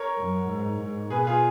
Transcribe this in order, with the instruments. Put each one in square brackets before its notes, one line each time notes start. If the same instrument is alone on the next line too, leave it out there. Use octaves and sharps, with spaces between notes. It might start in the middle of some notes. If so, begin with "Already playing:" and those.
Already playing: [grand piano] A#4 C#5
[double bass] F#2
G#2
G#2
[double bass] B2 [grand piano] G#4 B4
[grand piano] F4 G#4